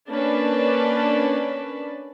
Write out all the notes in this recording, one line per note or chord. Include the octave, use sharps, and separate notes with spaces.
A#3 C#4 D4 B4 D5 A5